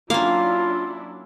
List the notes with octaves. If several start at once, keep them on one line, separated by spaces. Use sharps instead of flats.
F#3 A#3 C#4 D4 E4 F4 F5